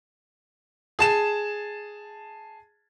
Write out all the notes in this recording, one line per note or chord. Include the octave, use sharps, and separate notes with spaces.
G#4 A5 E7